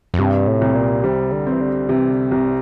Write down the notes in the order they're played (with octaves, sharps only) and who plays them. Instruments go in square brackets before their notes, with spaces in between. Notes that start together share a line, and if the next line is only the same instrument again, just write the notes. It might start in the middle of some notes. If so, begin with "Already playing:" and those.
[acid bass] F2
[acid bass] G2 [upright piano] C3
[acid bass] A2
[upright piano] C2
[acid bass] A#2
[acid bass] C3 [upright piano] G3
[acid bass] D3
[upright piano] C4
[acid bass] E3
D3
[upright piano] C3 [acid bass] E3
[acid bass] D3
[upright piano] C2 [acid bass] G2